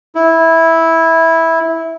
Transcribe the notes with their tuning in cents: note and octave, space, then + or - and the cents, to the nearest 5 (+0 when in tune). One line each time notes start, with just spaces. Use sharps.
E4 -10